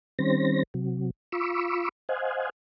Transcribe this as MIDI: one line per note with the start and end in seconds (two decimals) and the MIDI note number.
0.19 0.63 51
0.19 0.63 55
0.19 0.63 60
0.19 0.63 61
0.19 0.63 72
0.19 0.63 94
0.74 1.10 48
0.74 1.10 54
1.32 1.89 65
1.32 1.89 83
1.32 1.89 85
1.32 1.89 86
1.32 1.89 88
2.09 2.50 72
2.09 2.50 75
2.09 2.50 77
2.09 2.50 78
2.09 2.50 80